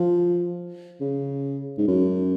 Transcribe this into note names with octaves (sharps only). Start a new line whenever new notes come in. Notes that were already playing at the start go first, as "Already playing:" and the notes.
Already playing: F3
C#3
G#2
F#2